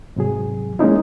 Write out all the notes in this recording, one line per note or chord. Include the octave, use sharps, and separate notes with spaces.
G#2 C3 F#3 G#4
G#3 A#3 C#4 D#4 E4